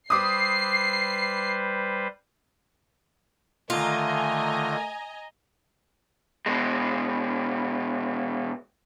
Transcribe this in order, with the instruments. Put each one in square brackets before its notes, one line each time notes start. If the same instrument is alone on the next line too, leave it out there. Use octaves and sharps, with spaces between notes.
[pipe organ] G3 B4 C5 [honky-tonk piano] D6 D#6 [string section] C7
[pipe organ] D3 D#3 [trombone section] A3 [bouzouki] F4 [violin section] D#5 G#5 A#5
[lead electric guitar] B2 G#3